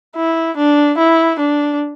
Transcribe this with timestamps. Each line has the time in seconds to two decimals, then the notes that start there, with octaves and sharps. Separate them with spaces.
0.16 E4
0.56 D4
0.98 E4
1.39 D4